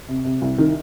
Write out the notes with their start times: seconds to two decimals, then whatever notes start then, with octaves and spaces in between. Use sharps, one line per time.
0.08 C3
0.25 C3
0.42 C2
0.58 D#3